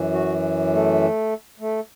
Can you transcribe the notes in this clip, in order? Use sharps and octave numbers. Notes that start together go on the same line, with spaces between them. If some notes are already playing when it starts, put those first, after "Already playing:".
Already playing: F#2 E3
F#4
A3
A3